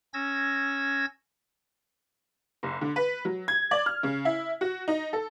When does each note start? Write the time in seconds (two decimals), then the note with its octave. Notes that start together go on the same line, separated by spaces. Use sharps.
0.14 C#4 E6 G#6 A#6
2.63 F#1
2.81 D3
2.96 B4
3.25 F#3
3.48 G#6
3.71 D5
3.86 F6
4.03 C#3
4.25 E4
4.61 F#4
4.88 D#4
5.13 A4